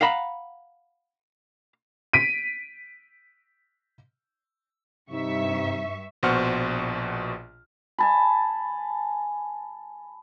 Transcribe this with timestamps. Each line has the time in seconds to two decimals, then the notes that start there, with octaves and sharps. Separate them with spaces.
0.01 F5 F#5 A#5 B5
2.13 B6 D7 D#7
5.10 G2 C3 D#4 E5 C#6
6.23 A#1 B2 C5 F#5 C#6 F6
7.98 G#5 A5 B5